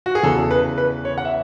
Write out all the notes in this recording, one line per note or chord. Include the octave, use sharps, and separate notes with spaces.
F#4
G#4
E2 C#3 E3 A4
B4
B4
C#5
F#5
E5